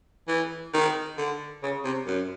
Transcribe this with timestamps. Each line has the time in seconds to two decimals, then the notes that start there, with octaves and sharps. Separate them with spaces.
0.28 E3
0.74 D#3
1.18 D3
1.63 C#3
1.84 C3
2.07 F#2